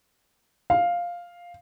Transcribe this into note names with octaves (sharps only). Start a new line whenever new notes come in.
F5